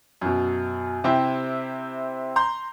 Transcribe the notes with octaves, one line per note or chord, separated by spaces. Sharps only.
F#2 B2
C3 C4 E4 G4
A#5 C6 G6